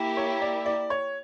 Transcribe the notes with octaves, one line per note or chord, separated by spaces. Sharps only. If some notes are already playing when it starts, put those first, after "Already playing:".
Already playing: A#3 E4 G4
C#5
D5
D5
C#5